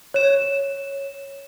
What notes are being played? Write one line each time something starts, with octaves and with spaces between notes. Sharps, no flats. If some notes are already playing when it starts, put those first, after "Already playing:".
C#5 E7